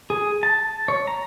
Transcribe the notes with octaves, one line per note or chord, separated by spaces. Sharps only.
G#4
A5
C#5
A#5